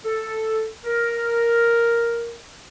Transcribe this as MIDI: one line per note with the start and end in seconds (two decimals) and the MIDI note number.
0.05 0.67 69
0.84 2.35 70